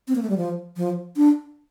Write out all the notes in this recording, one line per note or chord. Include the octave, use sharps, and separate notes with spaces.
C4
A#3
A3
G3
F3
F3
D4